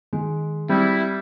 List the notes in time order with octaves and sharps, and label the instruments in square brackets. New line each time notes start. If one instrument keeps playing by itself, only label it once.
[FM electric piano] D#3 [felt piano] G#3
[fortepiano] G3 [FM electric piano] C4 [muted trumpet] E4